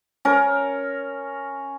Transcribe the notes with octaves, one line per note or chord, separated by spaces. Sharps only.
C#4 A#4